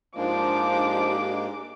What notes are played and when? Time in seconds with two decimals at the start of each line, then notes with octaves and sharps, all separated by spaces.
0.16 G#2 F3 G#3 A#3 D4 D#4 G4 D6